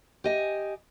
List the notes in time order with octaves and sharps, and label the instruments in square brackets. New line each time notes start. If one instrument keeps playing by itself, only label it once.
[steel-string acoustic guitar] G4 D#5 G#5